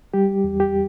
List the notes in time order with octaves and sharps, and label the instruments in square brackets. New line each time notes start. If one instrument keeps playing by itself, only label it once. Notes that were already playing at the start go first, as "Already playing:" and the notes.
[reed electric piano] G3 G4
E2
G4